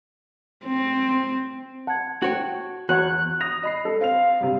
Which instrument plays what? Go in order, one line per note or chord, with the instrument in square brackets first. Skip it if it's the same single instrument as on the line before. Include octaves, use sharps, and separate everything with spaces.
[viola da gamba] C4
[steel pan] F#5 [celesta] A5 G#6
[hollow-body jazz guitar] F#4 C#5 G5
[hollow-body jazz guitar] E2 [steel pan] F#4 C#5 F#5 [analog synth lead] F#6
[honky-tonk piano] D#6 A#6 F7
D#5 B5 C7
A4
[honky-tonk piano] C4 F7 [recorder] F5
[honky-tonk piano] G2 C3